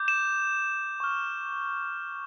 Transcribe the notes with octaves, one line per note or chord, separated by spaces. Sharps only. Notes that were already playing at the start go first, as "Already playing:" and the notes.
Already playing: D6 G6
E7
C#6 F6